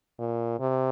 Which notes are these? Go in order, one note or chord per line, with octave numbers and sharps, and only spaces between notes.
A#2
C3